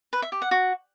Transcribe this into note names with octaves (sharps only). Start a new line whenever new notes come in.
B4
E5
G4
F#5
F#4